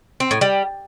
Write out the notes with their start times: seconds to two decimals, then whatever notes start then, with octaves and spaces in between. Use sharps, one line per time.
0.20 C4
0.31 A2
0.41 G3